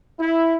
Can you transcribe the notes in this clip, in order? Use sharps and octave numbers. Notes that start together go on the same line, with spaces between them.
E4